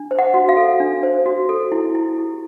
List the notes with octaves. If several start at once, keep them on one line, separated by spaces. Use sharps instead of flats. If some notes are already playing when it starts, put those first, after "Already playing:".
Already playing: D4
C5
F#5
F#4
F5
A4
D4
C5
F#4
A4
E4
E4
G4